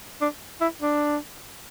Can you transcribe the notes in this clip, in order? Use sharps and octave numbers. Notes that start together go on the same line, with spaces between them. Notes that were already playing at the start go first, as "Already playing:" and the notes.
D4
E4
D4